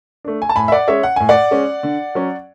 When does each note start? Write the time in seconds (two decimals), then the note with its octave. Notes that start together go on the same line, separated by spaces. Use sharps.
0.25 A3 D4
0.42 G#5
0.49 A5
0.56 A2 G#5 B5
0.68 E5
0.72 D5 F#5
0.88 G#3 C#4 C#5 E5
1.03 F#5
1.16 A2 G#5
1.29 D5 F#5
1.51 G#3 C#4
1.83 D3
2.15 F#3 C#4